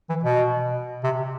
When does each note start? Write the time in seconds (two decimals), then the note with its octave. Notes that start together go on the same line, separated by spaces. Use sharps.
0.09 E3
0.24 B2
1.03 C3